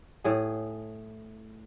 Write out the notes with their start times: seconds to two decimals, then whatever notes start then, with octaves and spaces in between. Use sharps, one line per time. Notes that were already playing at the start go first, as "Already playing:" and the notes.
0.24 A2 G#4